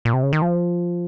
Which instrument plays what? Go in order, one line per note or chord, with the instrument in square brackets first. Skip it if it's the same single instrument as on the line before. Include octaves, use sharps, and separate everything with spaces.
[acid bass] A#2
C3
C#3
D#3
F3